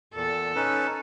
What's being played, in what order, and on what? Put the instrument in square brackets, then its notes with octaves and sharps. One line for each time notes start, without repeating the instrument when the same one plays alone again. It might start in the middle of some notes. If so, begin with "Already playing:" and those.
[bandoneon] E2 A#2 [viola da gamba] A4
[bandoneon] C#4 D#4 B4